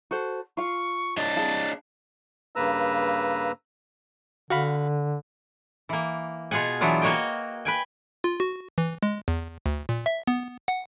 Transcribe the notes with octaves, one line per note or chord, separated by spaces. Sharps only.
F#4 A4 C5
F4 F5 C#6
D4 C#5 D#5 A6
G#4 F5 A5
G2 C#3 A#3 B4 A#5 E6
D3 F#4 F5 B5
E3 A#3
B2 F4 G#4 F#5 G#5
E3 F#3 B3 D4 F4
A#3 F#4 C#5 D#5 G5
B4 G5 G#5
F4
F#4
E3
G#3
E2
D2
A#2
E5
B3
F#5